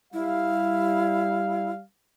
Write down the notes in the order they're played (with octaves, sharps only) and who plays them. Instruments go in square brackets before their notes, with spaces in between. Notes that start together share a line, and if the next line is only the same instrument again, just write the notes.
[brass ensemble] G3 F5 [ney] E4